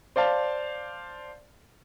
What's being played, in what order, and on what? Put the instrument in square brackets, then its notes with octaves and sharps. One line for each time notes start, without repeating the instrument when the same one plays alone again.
[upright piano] C5 D5 F5 A5